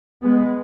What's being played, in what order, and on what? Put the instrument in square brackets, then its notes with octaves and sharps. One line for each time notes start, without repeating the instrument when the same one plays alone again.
[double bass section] G#3 B3